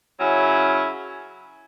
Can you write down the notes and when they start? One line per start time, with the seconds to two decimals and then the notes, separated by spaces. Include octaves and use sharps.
0.20 C#3 F#3 C#4 E4